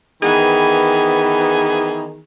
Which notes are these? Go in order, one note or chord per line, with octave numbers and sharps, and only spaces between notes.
D#3 E3 B3 G#4